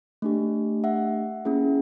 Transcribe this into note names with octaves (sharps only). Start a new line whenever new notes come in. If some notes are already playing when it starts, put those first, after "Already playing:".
A3 D4 G4
E5 F#5
A#3 C#4 E4 G#4